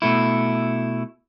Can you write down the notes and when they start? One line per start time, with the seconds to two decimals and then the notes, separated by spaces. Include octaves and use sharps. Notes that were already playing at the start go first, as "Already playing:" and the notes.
0.02 B2 A3 E4